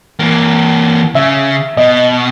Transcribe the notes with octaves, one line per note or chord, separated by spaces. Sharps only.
E3 A#3
C#3 E5
B2 D#5